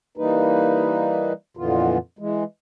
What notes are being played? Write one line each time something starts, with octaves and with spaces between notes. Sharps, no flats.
E3 G3 A#3 D#4 B4
F2 A#2 D3 E3 B3 F4
E3 G#3